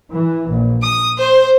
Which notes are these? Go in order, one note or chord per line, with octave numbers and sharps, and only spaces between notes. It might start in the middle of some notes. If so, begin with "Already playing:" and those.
E3
A#1
D#6
C5